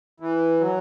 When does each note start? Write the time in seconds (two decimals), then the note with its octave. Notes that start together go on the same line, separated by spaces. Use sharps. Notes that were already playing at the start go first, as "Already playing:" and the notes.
0.20 E3
0.60 F#3